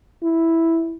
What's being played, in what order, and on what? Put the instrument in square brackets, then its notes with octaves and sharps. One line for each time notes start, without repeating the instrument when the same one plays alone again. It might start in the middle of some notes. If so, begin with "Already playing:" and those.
[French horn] E4